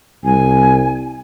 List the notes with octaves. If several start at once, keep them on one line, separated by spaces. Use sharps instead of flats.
C2 G#5